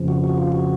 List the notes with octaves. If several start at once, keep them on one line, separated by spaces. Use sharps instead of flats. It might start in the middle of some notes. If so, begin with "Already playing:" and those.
Already playing: F2 C#3 F3
F#4
F#4
F4
F#4